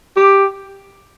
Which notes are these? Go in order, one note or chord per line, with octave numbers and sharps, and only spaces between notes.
G4